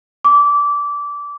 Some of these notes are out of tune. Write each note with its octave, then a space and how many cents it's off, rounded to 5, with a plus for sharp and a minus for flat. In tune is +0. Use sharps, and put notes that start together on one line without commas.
D6 -20